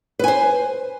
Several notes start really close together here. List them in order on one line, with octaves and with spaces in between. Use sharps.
B4 G#5 C5